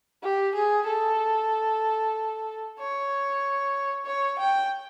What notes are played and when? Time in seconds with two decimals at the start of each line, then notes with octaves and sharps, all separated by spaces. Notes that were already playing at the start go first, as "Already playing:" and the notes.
0.23 G4
0.55 G#4
0.87 A4
2.79 C#5
4.06 C#5
4.39 G5